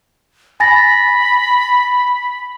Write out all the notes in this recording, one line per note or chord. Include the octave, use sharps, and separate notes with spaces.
G#5 B5 A6 A#6